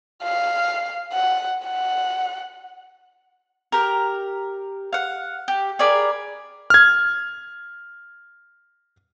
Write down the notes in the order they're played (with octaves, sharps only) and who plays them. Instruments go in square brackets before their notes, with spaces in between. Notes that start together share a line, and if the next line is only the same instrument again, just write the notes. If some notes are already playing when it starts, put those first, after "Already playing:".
[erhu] F5
F#5
F#5
[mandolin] G4 A#4
F5 F#5
G4
G#4 A#4 D5 B5
[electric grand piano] F6 G#6